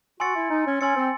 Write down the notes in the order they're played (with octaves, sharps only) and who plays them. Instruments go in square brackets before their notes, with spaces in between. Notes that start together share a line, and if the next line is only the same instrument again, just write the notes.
[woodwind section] F#4 [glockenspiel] G#5 C6 E6 A6 C#7
[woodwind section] E4
D#4
C#4
[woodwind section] C#4 [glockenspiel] G#5 C6 E6 A6 C#7
[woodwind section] C4